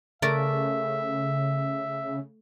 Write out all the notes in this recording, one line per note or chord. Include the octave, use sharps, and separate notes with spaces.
C#3 A3 A#4 D5 E5